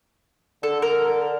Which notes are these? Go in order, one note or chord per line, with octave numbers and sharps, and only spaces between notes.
D3 A4
A#4